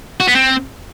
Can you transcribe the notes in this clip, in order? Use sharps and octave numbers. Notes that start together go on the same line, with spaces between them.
F#4
B3
C4